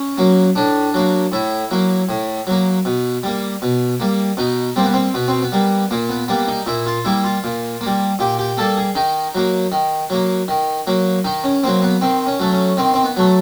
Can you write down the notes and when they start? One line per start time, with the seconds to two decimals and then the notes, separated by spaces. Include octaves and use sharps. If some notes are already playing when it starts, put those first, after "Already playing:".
Already playing: C#4
0.18 F#3 A#3
0.55 A2 D4
0.94 F#3 A#3
1.32 A2 E4
1.71 F#3 A#3
2.09 A2
2.47 F#3 A#3
2.85 B2
3.23 G3 A#3
3.62 B2
4.00 G3 A#3
4.37 B2 D#4
4.76 G3 A#3 C4
4.84 B3
4.94 C4
5.14 B2 B3
5.28 C4
5.42 B3
5.52 G3 A#3
5.91 A#2 A#3
6.09 B3
6.28 G3 A#3 B3
6.48 D#4
6.67 A#2 E4
6.86 F4
7.05 G3 A#3 E4
7.24 F4
7.44 A#2
7.81 A#3
7.86 G3
8.19 A#2 G4
8.39 G4
8.57 G3 A#3 A4
8.78 G#4
8.95 D#3 D#4
9.35 F#3 A#3
9.72 D#3
10.10 F#3 A#3
10.48 D#3
10.87 F#3 A#3
11.25 D#3 D#4
11.44 C#4
11.63 F#3 A#3 C4
11.82 B3
12.01 D#3 C4
12.27 C#4
12.40 F#3 A3
12.52 C#4
12.77 D#3 C4
12.94 C4
13.04 B3
13.17 F#3 A3